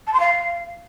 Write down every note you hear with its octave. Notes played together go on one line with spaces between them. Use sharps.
A5
C6
F5